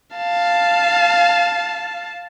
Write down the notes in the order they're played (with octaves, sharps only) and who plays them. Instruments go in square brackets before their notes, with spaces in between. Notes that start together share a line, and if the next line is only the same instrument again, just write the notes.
[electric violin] F5 A5